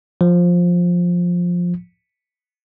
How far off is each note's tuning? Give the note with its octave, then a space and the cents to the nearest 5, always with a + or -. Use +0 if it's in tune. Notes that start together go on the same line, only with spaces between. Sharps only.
F3 +10